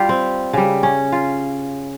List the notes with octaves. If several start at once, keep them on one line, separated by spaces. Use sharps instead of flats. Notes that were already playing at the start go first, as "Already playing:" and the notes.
Already playing: G3 F4 G4
C4
C#3 G3
C#4
F4